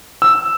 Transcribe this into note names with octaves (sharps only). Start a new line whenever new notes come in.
E6